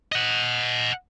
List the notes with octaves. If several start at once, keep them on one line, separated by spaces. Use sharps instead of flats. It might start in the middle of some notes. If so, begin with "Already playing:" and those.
D#5 F#5